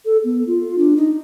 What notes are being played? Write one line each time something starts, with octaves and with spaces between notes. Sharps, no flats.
A4
B3
F4
D4
D#4